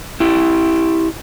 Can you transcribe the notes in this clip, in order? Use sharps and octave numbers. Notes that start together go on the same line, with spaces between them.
E4 G4